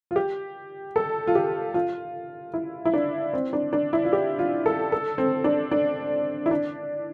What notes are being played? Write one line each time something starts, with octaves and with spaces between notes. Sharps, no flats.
F4
G4
A4
F4
G4
F4
E4
E4
D4
C4
D4
D4
E4
F4
G4
F4
A4
A4
C4
D4
D4
E4
D4